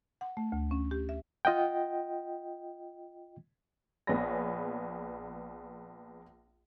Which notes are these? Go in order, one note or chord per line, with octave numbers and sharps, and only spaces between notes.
F#5
A3
D2
C#4
G4
E5
F4 D#5 F#5 G5
A#1 B3 G#4 C#5 B5 A#6